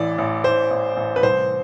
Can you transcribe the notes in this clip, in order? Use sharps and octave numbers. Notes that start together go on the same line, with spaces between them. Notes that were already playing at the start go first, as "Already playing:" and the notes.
Already playing: A1 E3 D5
A1
A1 C5
A1
A1
B4
C2 C5